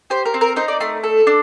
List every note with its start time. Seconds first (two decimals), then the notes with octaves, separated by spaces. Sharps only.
0.10 G4 C5
0.25 A#4
0.34 C4
0.41 A#4
0.56 D#4 C5
0.68 D5
0.80 A3 C6
1.04 A4
1.27 D4